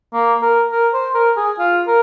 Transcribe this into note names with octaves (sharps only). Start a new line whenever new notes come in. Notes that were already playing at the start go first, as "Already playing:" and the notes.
A#3
A#4
A#4
C5
A#4
G#4
F4
A#4